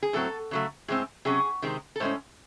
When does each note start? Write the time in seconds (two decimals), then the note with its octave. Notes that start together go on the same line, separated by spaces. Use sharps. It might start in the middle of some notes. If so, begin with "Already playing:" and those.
0.03 G#4
0.13 A2 F#3 C4 A4
0.51 C#3 F#3 A3
0.88 A2 G#3 C4 G#4
1.25 C3 F#3 C#4 G#4
1.62 C3 D#3 G#3 C4
1.96 A4
2.00 A2 G#3 C#4 C5